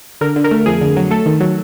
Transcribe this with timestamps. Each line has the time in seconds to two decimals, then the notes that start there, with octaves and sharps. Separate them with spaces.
0.21 D3 A#4
0.36 D3
0.44 A#4
0.51 A3
0.66 F2 G#4
0.81 D3
0.96 F#3
1.11 A3 A4
1.26 D#3
1.40 F#3